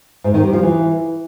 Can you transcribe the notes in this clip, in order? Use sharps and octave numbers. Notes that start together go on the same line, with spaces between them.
G#2
D#3
G3
F3
E3